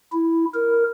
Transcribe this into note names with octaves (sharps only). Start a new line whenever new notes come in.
E4
A#4